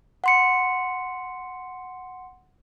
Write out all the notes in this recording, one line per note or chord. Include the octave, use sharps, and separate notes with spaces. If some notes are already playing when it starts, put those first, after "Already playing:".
F#5 C6 C#7